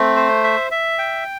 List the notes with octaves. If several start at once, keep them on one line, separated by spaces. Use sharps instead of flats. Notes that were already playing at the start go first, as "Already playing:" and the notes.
Already playing: A3 C4
C5
E5
E5
G5